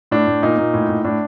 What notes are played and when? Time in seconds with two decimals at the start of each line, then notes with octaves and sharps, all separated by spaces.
0.11 A2 D4
0.27 A2
0.43 A#2 D#4
0.58 A#2
0.74 A2
0.89 A2
1.04 A2 D4